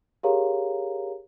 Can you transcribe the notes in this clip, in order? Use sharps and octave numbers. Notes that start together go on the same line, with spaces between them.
G4 G#4 A#4 C#5 F5 A#5